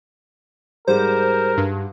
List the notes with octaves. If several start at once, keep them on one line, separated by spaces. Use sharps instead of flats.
G#2 G3 A#4 C5
G2